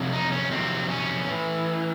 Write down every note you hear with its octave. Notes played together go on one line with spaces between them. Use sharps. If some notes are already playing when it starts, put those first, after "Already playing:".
Already playing: F2 C3 F#3
D#4
C#4
F2 C3 D#3 F#3 C4
C#4
A2 E3